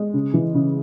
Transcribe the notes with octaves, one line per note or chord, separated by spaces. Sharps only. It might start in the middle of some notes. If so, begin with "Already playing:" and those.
Already playing: G#3
C#3
E3
C#3